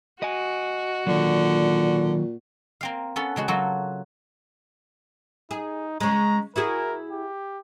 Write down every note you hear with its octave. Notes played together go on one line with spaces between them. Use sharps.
F#4 D#5 G#5
A#2 D3 D#3 F#3
A#3 C4 F5
B3 C#4 A4
C#3 G#3 F#4
F#3 A#3 F4 F#4 A4
D#4 G#4
C#3 G#3 A#5
E4 F#4 G#4 A#4
G4